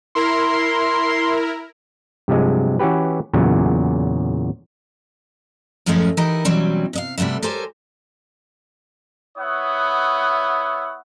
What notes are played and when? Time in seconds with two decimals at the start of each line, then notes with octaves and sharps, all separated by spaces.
0.15 E4 A#4 C6
2.28 G2 C3 F3 F#3 G#3
2.79 E3 C#4 F#4 G4 B4
3.33 E2 A#2 C#3 F#3
5.86 F#2 A2 F3 G#3 A3 C#4
6.17 E3 D#4 E4 G4 A#4
6.45 B2 E3 F#3 G3 C4 C#4
6.93 C3 D#5 F5
7.18 C3 G3 A3 B3 E5
7.42 G4 A4 A#4 C5 C#5 G#5
9.38 B3 E4 C#5 E5 F#5 D#6